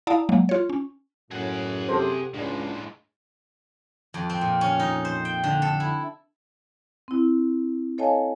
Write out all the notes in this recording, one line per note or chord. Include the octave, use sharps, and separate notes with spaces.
E4 D5 F5 A5 A#5 D#6
F#3 G#3 A#3
F4 C#5
C#4
F#2 A2 G#4 F#5
C3 G4 A4 C5
C#2 A2 G#3 D4
F2
C4
A#2
C#4
D#4
C5
G5
D3
A4
E4
C4 E4
A4 C#5 D#5 F5 G#5 A5